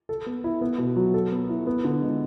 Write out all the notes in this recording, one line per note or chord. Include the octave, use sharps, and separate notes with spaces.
A4
B3
E4
B3
B2
F#3
A4
B3
E4
B3
D3
G#3